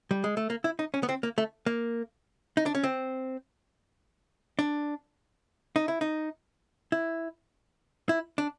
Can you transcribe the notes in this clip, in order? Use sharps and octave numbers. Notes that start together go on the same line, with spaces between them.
G3
G#3
A3
A#3
E4
D#4
C#4
B3
C4
A#3
A3
A#3
D#4
D4
C#4
C4
D4
D#4
E4
D#4
E4
E4
D4